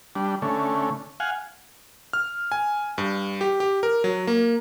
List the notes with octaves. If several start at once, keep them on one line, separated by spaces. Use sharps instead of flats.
G3 D4
D3 A3 C#4
F5 F#5 G#5
F6
G#5
G2
G4
G4
A#4
F#3
A#3